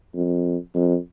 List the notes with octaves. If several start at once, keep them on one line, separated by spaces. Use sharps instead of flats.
F2
F2